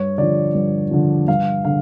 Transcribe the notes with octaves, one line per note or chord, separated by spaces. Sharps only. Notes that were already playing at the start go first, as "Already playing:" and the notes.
Already playing: G2 C#5
D3 F3 D5
G2
D3 F3
G2 F5
D3 F5